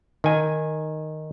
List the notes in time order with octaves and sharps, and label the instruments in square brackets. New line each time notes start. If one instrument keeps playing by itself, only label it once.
[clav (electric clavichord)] D#3 G#5